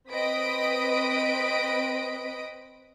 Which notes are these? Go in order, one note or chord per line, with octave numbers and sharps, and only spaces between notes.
C4 B4 D#5 D#6 B6 D7